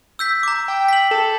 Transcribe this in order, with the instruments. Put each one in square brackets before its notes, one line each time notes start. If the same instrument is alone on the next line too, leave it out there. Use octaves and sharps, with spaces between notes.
[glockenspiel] E6 G6 B6
A#5 D6
[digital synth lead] G5
[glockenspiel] B6 F#7
[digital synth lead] A4